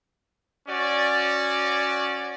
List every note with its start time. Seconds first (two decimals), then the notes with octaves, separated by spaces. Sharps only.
0.68 C#4 F#4 D5